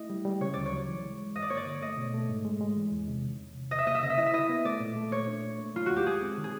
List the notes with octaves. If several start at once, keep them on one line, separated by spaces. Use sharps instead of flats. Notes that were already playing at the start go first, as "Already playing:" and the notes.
Already playing: A3 E4 D#5
G3
G3
C#3 C#5
D2 D5
C#5
F#3
E3
G#3
G#3
G2 D#5
D5
A#3 C#5
D5
D3
A3 D#5
B2
A3
G#2
G#3
G#3
E3
E2
C3
D#3
E2
C3
C#3 D#5
E5
A#3 D#5
E5
C#3 D#5
E5
E4 D#5
E5
E4 D#5
B3
A3 D5
A#2
A3
A#2 C#5
D4
A3
A#3
F#3 F4
D#2 F#4
G4
G#3 G#4
C4
D#3
G#4